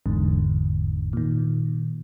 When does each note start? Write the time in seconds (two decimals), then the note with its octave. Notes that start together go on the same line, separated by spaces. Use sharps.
0.06 G1 E2 G#2 D3
1.13 A#2 D#3